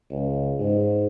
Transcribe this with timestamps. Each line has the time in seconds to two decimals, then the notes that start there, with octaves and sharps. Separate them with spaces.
0.11 C#2
0.60 G#2